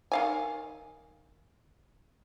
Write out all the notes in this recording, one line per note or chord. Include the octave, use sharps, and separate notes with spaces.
D#3 F5 G#5